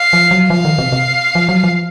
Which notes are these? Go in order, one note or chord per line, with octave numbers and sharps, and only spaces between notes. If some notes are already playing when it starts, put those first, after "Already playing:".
Already playing: F5
F3
F#3
F3 F5
D#3
C3
C3
F3
F#3
F3